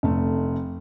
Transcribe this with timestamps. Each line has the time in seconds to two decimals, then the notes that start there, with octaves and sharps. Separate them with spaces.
0.03 F1 A3